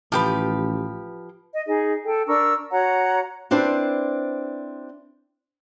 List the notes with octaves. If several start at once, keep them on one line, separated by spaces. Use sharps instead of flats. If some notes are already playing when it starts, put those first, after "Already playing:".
A1 F3 G4 B4
D#5
D#4 G#4 D#5
A4 G5
D4 A#4 C#6 E6
F#4 C#5 F#5 A#5
C4 D4 E4 B4 C5 D5